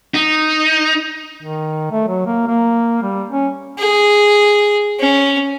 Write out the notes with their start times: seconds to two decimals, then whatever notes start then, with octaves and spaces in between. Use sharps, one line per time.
0.14 D#4
1.43 D#3
1.92 A3
2.08 F#3
2.27 A#3
2.47 A#3
3.02 G3
3.30 C#4
3.79 G#4
5.00 C#4